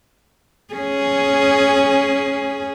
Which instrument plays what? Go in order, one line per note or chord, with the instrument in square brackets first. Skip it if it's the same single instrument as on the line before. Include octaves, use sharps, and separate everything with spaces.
[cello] C#4 G#4